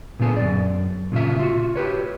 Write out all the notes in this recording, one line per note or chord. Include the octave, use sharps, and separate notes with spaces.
A#2 D3 B3 G#4
F#2 D5
A#2 C#3 F4 E5
F4 F#4
G4 B4 C#5